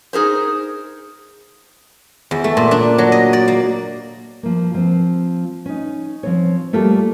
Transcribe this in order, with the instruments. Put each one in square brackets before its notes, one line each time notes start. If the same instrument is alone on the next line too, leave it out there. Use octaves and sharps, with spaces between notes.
[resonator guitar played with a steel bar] D#4 G#4 A#4 C5
[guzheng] E2
A3
A#2
D4
F#3
D#5
D5
A#3
[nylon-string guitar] F3 A#3
F3 C4
C#4 D#4
F3 C4 C#5
G3 A3 A#3 F4 G4 A4